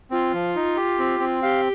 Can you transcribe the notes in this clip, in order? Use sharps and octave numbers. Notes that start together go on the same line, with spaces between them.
C4 F4
F3
D#4
G4
C4
C4
G4 F5